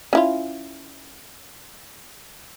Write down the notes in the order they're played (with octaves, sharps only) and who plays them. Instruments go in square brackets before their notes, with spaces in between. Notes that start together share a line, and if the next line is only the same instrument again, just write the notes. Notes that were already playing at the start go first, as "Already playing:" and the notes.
[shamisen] C#4 E4 F4